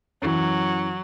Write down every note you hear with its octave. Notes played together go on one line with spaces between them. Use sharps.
F#2 E3 F#3